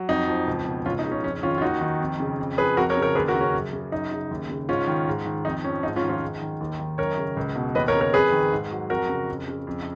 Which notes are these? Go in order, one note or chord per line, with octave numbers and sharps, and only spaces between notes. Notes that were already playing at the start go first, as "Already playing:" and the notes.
Already playing: F#3
F2 D#4
F3
C#2
B2
C#2 C#4 F4
D#4
C#3
C#4
F2 C#4
D#3 C#4 F4
F4
D#2 D#4 F#4
D#3
F2
C#3
F2
F3 G#4 B4
F2 F#4 A#4
A#4 C#5
C#3
A#4 C#5
D#2 G#4 B4
F#4 A#4
C#3
C#4
F#2
C#3
F#2 D#4
C#3
D#2
C#3
G#2 C#4 F4
D#3
G#2
D#3
F2 D#4
F3 C#4
G#2 D#4
C#4 F4
D#3
C#4 F4
G#2
D#3
D#2
D#3
F#2 A#4 C#5
C#3
C#2
B2
D#2 B4 D#5
A#4 C#5
C#3
A#4 C#5
F2 G#4 B4
D#3
G#2
F#3
F2 F#4 A#4
C#3
F2
C#3
F2